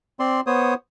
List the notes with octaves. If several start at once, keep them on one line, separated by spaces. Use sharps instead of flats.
C4 D5 C6
B3 C5 C#5 D#6